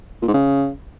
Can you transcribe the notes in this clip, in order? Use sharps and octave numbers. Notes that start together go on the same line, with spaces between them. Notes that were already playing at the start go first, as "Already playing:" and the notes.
A#2
G#2
C#3